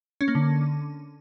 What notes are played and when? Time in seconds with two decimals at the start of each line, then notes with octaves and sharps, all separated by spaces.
0.21 C#4
0.28 A#3
0.35 D3